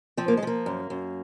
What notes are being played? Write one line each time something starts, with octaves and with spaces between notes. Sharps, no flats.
F3 C4
A#3
G#3
F3 A#3
F#2
F#2